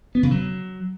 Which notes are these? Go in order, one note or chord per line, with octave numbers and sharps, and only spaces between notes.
B3
C#3
F#3